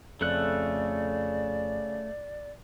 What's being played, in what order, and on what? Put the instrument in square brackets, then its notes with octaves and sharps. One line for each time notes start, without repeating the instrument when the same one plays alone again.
[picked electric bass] F2 [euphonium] C#3 [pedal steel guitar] A3 A4 F#6 [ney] D5